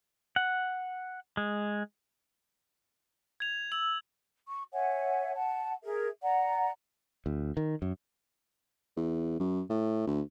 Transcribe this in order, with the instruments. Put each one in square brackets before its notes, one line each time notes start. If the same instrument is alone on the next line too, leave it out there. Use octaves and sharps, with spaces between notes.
[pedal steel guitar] F#5
G#3
[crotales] G#6 F7
[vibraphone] E6 [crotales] F#7
[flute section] C#6
C#5 E5 F#5 G#5
F#5 A5
G#4 A#4 E5
D5 F#5 A#5
[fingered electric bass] D2
D#3
F#2
[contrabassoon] E2
F#2
A2
D2